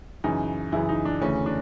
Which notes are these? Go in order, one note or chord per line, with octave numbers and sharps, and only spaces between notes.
F#2 C#3 E3 D#4
F#2 C#3 E3 E4
D#4
D4
D2 C#3 E3 C#4
D4